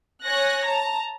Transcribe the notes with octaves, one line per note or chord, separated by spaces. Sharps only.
C#5 G#5 F#6 A#6
A5 A#5